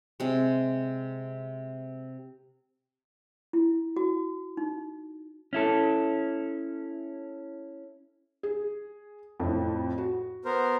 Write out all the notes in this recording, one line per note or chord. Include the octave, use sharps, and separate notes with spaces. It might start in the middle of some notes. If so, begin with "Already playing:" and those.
C3 G#3
E4
F#4
D#4
C#4 E4 A4
G#4
F2 A2
F#4
B3 A#4 C5